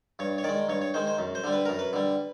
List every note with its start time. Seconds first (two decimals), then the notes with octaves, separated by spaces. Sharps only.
0.19 G2 C#5
0.38 C#5
0.44 D#3 G#3 D5
0.69 G2 C#5
0.82 C#5
0.94 D#3 G#3 C5
1.07 C5
1.18 F#2
1.35 C5
1.44 D3 G3
1.53 B4
1.65 F#2 A#4
1.79 B4
1.93 D3 G3